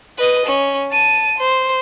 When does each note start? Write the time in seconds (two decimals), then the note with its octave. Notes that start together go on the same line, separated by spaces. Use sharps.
0.18 B4 D#5
0.46 C#4
0.91 A5 D#7
1.38 C5